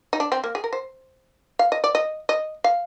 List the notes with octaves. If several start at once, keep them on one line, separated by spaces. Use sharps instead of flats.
D#4
D4
C4
A#3
G#4
A#4
C5
F5
D#5
D5
D#5
D#5
F5